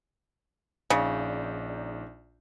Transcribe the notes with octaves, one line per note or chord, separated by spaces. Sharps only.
A#1 C#3 D#4 D5